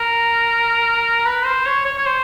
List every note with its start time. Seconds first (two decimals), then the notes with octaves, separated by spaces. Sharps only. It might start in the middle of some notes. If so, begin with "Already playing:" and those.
Already playing: A#4
1.26 B4
1.45 C5
1.66 C#5
1.85 C#5
1.97 C#5
2.06 C5